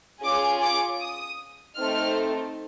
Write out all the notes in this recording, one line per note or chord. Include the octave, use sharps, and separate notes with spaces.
C#4 F4 G#4 D6
D6
D#6
A3 C4 D#4 F6